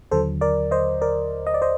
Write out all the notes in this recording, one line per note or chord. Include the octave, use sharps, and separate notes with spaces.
D#2 D3 F#3 A4 C5
A#4 D5
C5 D#5
A#4 D5
D#5
D5
C5 D#5